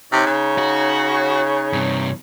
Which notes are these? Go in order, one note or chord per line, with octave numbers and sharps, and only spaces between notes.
C3 D#4 C#5
C#3
F#4
G2 C3